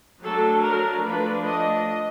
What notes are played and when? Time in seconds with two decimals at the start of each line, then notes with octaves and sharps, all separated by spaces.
0.24 F#3 A3 D4 A4
0.65 A#4
1.05 F3 A3 D4 B4
1.47 D#5